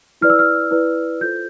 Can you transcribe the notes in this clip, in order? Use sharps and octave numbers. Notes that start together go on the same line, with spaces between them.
E4 B4 D5 F6
E6
F6
E4 B4 D5
F4 A4 C5 G6